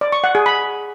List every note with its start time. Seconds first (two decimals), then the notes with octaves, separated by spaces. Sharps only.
0.01 D5
0.12 C#6
0.24 F#5
0.35 G#4
0.46 B5